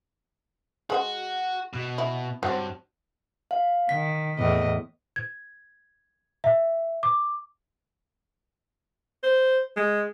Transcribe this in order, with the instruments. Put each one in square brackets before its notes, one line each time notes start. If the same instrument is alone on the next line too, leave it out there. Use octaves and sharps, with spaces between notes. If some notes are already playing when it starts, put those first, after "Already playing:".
[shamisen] G#3 B4 F#5 [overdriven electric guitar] F#4
[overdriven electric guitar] B2
[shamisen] E4
[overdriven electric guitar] G2 [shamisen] F#3 C4
[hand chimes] F5
[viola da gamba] D#3 [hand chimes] B6
[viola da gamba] E2 A2 D#5
[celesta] G#6
E5
D6
[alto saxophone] C5
G#3